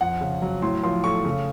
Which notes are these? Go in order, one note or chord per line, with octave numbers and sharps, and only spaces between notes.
F2 F#5
C#3
F#3
A2 C6
F3 C6
A3 C#6
C#3